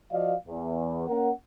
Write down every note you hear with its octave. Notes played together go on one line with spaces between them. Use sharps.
F3 F#4 D5 D#5 F5
E2
A#3 C#4 A#4 F#5